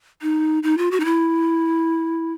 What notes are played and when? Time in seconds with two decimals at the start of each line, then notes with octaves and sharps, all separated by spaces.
0.22 D#4
0.63 D#4
0.78 F4
0.91 F#4
1.00 D#4
1.05 E4